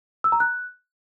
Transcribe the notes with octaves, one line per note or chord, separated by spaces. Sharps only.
E6
A#5
F#6